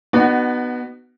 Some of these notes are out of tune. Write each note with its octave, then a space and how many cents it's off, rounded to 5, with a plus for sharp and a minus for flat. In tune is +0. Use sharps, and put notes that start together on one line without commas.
B3 +0 D#4 -40 F#4 +20